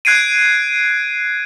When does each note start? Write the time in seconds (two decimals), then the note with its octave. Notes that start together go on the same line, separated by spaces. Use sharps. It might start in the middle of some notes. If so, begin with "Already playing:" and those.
0.05 F#6 G#6 C7 D7 D#7